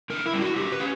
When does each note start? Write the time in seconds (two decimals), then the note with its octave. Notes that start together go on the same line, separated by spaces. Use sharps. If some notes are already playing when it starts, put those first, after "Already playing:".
0.10 D3 A#4
0.26 E4
0.33 G3 C#4
0.41 F#4
0.56 D3 G4
0.72 B4
0.80 C#4